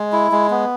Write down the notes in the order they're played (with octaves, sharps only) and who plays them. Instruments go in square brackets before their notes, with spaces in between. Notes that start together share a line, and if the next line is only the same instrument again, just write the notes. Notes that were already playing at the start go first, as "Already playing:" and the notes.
Already playing: [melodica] G#3
E4
G#3
B3